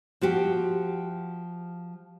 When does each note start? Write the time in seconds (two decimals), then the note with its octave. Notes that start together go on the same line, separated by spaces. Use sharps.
0.21 F3 F#4 G4